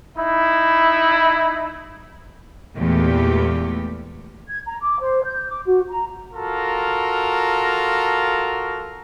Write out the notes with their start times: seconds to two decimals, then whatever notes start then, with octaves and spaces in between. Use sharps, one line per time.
0.17 D#4 E4
2.77 E2 A#2 G#3 A3 G4
4.49 G#6
4.66 A#5
4.82 D6
5.01 C5
5.24 G6
5.49 D6
5.66 F#4
5.89 A#5
6.33 F4 F#4 A4 A#4 A#5